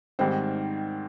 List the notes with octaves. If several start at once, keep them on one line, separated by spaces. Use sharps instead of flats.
G#2 D#3 G3 C4